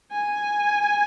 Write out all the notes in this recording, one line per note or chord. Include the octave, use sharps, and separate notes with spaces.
G#5